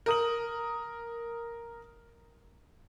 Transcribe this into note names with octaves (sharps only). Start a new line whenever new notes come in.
A#4 D#6 F#7